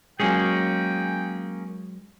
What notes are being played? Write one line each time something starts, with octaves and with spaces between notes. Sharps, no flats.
F#3 G#3 A#3 C#4 G#4 G5